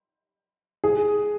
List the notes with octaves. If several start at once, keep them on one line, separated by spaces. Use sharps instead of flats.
G#4